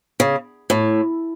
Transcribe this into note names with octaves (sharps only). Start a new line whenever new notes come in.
C#3
A2